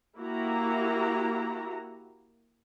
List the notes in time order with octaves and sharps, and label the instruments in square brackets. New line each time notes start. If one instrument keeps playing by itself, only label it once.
[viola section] A#3 E4 F#4 G4 A#5